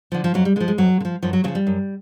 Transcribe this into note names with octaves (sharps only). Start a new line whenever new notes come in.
D3 F3
F3
F2 F#3
G3
D3 G#3
F3
G#3
F2 F#3
D3
F3
F#2 F3
F#3
C#3 F3 F#3
G3
F#2